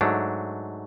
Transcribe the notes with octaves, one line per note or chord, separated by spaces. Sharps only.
G#2 F#3 A3 D4